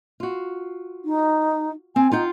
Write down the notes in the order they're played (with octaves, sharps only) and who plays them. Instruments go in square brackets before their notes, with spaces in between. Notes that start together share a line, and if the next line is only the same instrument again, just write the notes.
[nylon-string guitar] F4 F#4
[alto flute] D#4
[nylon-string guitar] C4 [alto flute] G#5
[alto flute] D#4 [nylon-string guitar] F4 F#5 G5